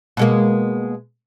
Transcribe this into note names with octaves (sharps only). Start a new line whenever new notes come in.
B2 G#3 A#3